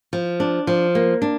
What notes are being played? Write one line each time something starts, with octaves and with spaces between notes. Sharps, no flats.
F3
D4
F3
A#3
D4